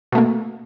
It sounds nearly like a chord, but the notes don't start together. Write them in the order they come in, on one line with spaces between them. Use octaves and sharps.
B2 A3 A#3